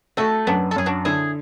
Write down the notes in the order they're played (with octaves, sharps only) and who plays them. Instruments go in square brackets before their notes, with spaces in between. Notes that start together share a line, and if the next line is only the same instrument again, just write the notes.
[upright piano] A3 [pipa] F#4 A4
[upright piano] F#2 [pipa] B3 D4
[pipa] A4
[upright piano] F#2 [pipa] G#4
[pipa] D4 F#4
[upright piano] D3 [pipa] E4 G#4